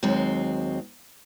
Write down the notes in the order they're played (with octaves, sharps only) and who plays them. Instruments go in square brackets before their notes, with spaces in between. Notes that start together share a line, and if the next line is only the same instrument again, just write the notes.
[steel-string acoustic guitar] D#2 F#3 G#3 C4